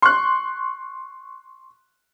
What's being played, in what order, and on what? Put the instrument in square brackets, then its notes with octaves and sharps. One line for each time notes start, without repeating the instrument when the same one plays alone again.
[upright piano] C6 C#6 F#6